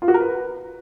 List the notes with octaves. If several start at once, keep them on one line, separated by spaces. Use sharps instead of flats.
F4
F#4
A#4
B4